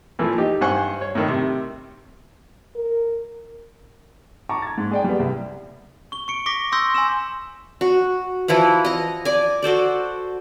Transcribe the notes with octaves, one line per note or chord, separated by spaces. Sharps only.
A#2 E3 F3 A3
D#4 G4
G2 C5 F#5 G#5 C#6
C#5
A2 D#3
C3
A#4
A5 A#5 C#6 D6
G#6 A6
G#2
G#4 D5 G5
G3 B3
C2
C#6 G7
C#6 C#7 D7
C#6 D6 A#6 B6
C6 C#6 D#6 E6 G6 A#6
G#5 C6 E6 E7
F#4
E3 F3 E4 F#5
D#5 A#5
D5 G#5
F#4 A4 C5 D5